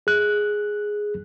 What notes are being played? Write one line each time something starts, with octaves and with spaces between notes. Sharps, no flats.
G#4 F#6